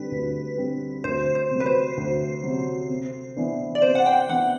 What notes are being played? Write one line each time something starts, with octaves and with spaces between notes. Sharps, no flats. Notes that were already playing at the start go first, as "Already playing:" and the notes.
Already playing: D3 G3 C4 B4
D2
D3 G3 C4
D2 C5
C5
C3 F#3
B4
C5
D2
C3 F#3
C3
E3 B3 D4
D5
C3 C5
F#5
G5
E3 B3 D4 F#5